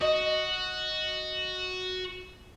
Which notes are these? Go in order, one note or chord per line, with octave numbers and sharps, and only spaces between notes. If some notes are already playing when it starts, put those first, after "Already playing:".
F#4 D#5